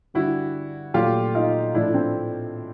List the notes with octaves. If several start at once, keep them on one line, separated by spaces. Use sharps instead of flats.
G2 D3 G3 E4 F#4
A#2 F#3 A3 F4 G4
D#4 F4
A2 F3 A3 D4 E4
C4